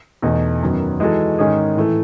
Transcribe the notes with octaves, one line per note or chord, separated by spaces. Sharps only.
E2 B2 A3 D#4
F#2 D#3 F#3 B3
E3 G#3 D#4 F#4 A4
G#2 D#3 G#3 C#4 G#4
A2 E3 A3